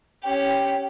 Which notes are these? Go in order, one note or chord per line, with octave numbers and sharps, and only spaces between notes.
C#4 G4 G5